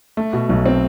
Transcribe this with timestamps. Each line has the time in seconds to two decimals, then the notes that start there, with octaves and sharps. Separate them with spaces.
0.17 A3
0.33 B2
0.49 B1
0.66 C4